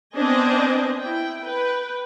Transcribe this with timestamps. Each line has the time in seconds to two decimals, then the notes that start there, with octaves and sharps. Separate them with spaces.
0.15 B3 C4 D4 C5 D#5 G#5
0.99 E4 G5
1.40 B4 G5